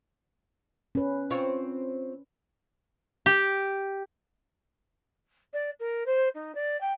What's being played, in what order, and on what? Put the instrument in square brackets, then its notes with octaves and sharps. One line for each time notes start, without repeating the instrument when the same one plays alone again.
[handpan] C#4 B4
[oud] C4 F4 C#5
[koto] G4
[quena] D5
A#4
C5
D#4
D5
G5